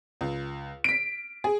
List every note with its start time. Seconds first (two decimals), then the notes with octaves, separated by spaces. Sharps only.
0.21 C#2
0.84 B6 D7
1.44 G#4